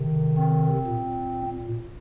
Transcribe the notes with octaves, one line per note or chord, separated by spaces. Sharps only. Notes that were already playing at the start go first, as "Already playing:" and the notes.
Already playing: C3 D#3
C4
A#2